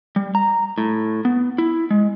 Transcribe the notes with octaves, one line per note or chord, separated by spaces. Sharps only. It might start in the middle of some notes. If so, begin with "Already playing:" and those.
G3
A#5
A2
B3
E4
G#3